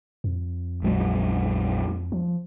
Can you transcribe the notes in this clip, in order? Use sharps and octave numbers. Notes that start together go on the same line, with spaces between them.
F2
A#1 F#3 G#3
F3